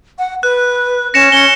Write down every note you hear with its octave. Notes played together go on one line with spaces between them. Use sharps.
F#5
B4 F#6
C#4 A#6 C#7 E7
C#4 C#7 G7